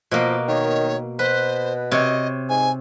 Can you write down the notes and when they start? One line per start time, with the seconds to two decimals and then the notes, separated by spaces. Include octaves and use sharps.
0.11 B2 F3 A#3
0.48 D#3 C#5
1.19 B2 B4 C5
1.91 C3 C#5 D#5
2.49 G#2 G#5